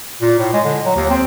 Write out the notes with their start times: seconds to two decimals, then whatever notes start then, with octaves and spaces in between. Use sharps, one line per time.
0.21 A#2
0.39 A2
0.53 G#3
0.64 D3
0.85 F#3
0.96 D#2
1.09 C4